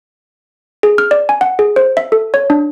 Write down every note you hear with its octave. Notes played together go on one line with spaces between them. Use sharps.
G#4
F6
D5
G#5
F#5
G#4
C5
E5
A4
C#5
D4